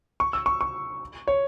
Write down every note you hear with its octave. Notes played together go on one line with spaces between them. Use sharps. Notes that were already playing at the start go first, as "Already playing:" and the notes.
C#6
E6
C#6
C#6
C#5